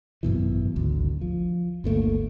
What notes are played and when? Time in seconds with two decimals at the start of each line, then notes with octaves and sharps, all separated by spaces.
0.23 G#1 F#2 B2 E3
0.76 G#1 D2
1.21 F3
1.84 G1 D2 A3 A#3